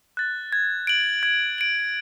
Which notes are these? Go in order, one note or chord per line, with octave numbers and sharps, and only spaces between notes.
F#6 A6
G#6
D7 F#7
G#6
D7 F#7